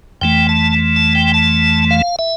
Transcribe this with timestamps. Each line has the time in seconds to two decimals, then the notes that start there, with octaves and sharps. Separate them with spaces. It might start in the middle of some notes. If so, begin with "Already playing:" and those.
0.21 F2 E3 A3 G5
0.49 A5
0.96 A5
1.15 G5
1.34 A5
1.90 F5
2.19 E5